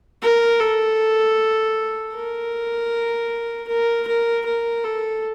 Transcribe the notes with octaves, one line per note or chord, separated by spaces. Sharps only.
A#4
A4
A#4
A#4
A#4
A#4
A4